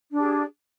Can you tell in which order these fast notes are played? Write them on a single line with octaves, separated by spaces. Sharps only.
D4 G4 G#4